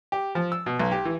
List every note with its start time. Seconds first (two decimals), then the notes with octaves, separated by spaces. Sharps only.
0.12 G4
0.35 F3
0.52 E6
0.66 B2
0.80 B1
0.92 G4
1.05 E3